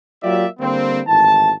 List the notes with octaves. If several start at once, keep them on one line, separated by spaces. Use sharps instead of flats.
F#3 A#3 F4 G4 D5 E5
D3 G3 A#3 C4
G#1 A2 E3 A5